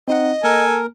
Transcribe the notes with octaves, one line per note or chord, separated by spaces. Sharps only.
C4 D#4 D#5 F#5
A#3 A4 A#4 G#5